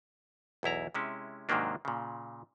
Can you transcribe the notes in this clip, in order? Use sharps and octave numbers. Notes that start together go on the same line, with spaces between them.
B1 E2 E4 A#5
C3 G#3 C#4 E4
G#2 C3 D#3 F#3 A#3 D4
A#2 C#3